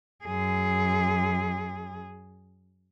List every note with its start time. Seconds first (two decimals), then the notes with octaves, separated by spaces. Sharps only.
0.24 F#2 G#4